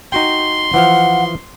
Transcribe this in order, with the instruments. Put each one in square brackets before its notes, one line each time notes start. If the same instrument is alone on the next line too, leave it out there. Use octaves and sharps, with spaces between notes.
[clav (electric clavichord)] D#4 F#4 G5 [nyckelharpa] C6
[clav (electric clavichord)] E3 F3 F5 [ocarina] F#5